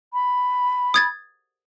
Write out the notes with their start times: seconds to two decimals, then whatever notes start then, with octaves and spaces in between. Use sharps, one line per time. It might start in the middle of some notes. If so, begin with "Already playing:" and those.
0.13 B5
0.94 D#6 G#6 A6